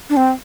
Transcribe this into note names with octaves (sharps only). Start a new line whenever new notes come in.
D4
C4